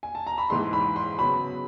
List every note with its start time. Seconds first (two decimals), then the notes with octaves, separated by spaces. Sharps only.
0.03 G#5
0.15 A5
0.27 A#5
0.38 B5
0.50 G#2 E3 G#3 C6
0.73 B5
0.96 C6
1.19 C#3 F#3 B3 B5